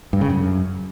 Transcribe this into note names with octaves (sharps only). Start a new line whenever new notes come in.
G2
C#3
F#2